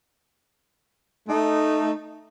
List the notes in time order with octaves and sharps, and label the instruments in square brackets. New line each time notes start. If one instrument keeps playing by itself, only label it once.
[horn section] A3 D#4